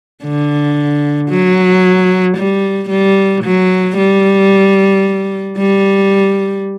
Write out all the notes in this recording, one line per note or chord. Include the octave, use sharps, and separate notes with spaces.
D3
F#3
G3
G3
F#3
G3
G3